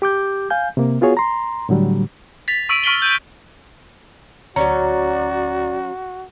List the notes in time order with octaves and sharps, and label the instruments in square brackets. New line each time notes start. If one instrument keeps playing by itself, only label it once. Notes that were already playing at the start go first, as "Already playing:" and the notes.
[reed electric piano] G4 D6 G6
F5 G#5 G6
C3 A#3
B3 F4 F#4 G#4 C#5
A#5 C6
A2 D3 F#3 G3
[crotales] A6 B6 F7
C#6 E6 B6 D7 D#7
C#6 F6 B6 D7 D#7 G7
G6
[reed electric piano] D2 A#5 [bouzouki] F#3 B3 C#4 [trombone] F#4 [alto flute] D5